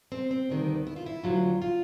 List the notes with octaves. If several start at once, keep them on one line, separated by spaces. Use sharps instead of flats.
C4
C4
D2 C3 D#3 G3 B3
E4
F4
E4
D2 D3 F#3 F4
F4